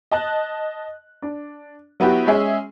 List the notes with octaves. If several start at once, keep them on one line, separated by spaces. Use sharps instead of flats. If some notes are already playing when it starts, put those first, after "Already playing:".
D#5 A5 F#6
D4
F#3 B3 E4 F#4 G4
G#3 C#4 G#4 E5